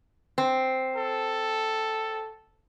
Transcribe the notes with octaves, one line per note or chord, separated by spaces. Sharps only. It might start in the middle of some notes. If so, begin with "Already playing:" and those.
C4
A4